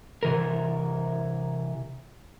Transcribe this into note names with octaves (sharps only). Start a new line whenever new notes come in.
C3 E3 A#4